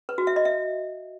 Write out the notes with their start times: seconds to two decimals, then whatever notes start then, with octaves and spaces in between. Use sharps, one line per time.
0.09 B4
0.18 F#4
0.27 E5
0.36 D#5
0.45 E5